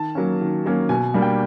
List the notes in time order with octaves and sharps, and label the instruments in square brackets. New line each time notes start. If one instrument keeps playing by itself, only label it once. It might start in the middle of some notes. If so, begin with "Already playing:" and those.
Already playing: [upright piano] D#3 A5
F#3 A#3 C#4
D#3
F#3 A#3 C#4
B2 G#5
G3 A#3 D4
G5